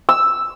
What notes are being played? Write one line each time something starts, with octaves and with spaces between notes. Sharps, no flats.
E6